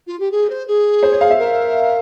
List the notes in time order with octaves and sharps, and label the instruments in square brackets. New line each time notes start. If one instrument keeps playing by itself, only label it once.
[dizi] F4
G4
G#4
C5
G#4
[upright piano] C5
C#5
F5
E5
[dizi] A#4